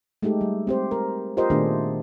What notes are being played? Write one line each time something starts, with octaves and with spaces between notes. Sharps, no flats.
G#3 A3 D#4 G4 A4
G3
C4 G4 C5
A#4
F4 G4 A#4 C5 D#5
A#2 D#3 A3 B3 D4 G#4